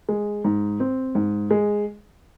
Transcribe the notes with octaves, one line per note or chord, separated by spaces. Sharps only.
G#3
G#2
C4
G#2
G#3